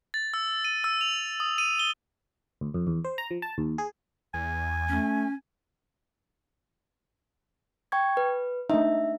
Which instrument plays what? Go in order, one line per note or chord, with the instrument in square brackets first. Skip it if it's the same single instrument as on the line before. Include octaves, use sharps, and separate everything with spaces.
[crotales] A6
E6
D#7
E6
F7
D#6
D#7
G7
[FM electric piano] D2
F2
E2
C5
A#5
F3
A5
D#2
G#4
[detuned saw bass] E2 [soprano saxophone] G#5
[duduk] A3 [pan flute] C#4
[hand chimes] G5 C#6 G#6
B4
[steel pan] A3 D4 D#4 [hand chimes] E5